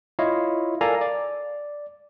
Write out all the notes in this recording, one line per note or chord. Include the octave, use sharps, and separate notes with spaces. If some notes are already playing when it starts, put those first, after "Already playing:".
E4 F4 C#5 D#5 F5
A4 A#4 D5 F5 G#5 A#5
D5